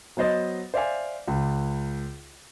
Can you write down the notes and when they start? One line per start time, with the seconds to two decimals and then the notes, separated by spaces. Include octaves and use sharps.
0.17 F#3 B3 C5 D#5 A6
0.74 C5 D5 E5 F5 G#5
1.28 C#2